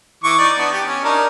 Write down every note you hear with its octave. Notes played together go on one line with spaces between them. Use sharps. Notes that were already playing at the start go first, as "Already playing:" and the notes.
E3 C#6 D6
D#4 D5
B3 D4
G4
C#4
D4 D#4 A#4